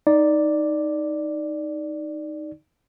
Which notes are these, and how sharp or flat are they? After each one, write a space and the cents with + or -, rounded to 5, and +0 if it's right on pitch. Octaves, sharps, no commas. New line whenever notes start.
D#4 +0 D5 +0